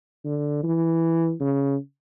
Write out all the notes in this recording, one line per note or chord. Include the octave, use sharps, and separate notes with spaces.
D3
E3
C#3